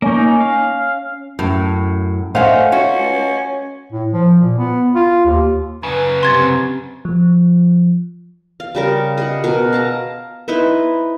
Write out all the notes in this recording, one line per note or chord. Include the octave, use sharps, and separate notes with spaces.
A#3 C#4 D#4
F5
F#2 A2
A3 C#4 C5 D#5 F5 F#5
C#4 F#4
A2
F3
A#2
B3
F4
D#2
F#2 C#3 B4
C3 C6 G#6 A6
F3
F5
C#3 G3 A#4
G#4 D#5 F#5
B2 A#4
F5 A5 A#5
D#4 E4 B4 C5